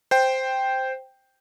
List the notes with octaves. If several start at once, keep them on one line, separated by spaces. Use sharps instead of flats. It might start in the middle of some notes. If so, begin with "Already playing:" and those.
C5 G5